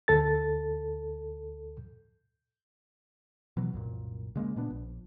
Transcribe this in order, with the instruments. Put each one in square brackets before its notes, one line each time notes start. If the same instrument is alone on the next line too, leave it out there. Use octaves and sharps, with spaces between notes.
[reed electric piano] D2 A4 A6
[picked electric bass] B2 E3 F#3
C2 F#2 A#2
C#3 G#3 A#3
A#2 B3 D4
A#1